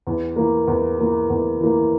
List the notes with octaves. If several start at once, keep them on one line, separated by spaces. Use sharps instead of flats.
E2
E3 A#3
E2
E3 A#3
E2
E3 A#3